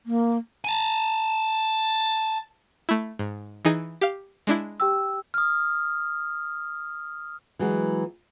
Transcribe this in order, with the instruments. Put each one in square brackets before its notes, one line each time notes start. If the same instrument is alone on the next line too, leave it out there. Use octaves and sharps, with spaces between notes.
[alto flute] A#3
[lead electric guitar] G#5 A5
[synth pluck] A3 E4
G#2
E3 D#4 G#4
G4 F5
G#3 D4 E4
[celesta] G4 G5 E6
[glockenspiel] D#6 F6
[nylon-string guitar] E3 F#3 G#3